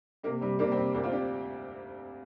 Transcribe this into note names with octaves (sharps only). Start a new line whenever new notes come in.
C3 A#3
C3 G3
C3 A#3 D4
G3 C4
C3
D2 A#3 D4
C4 F4
D4 G4